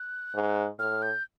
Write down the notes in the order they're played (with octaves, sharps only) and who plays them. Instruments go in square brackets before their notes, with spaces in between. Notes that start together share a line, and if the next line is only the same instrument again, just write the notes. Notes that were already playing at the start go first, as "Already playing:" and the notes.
Already playing: [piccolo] F#6
[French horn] G#2
[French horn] A2 [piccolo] F6
[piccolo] G6